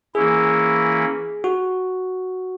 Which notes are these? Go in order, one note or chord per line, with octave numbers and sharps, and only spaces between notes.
E3 A#3 C#4 E4 G#4
F#4